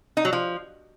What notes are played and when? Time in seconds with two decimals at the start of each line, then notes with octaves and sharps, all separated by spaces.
0.17 D#4
0.25 F#3
0.33 F3